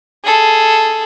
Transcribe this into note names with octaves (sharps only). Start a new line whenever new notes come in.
G#4 A4